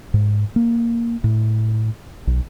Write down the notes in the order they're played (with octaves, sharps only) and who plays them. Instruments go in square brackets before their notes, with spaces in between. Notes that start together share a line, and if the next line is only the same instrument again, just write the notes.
[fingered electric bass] G#2
A#3
A2
B1